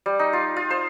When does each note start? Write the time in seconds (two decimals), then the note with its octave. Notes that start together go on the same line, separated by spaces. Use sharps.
0.06 G3
0.19 D#4
0.33 F4
0.56 F4
0.71 C5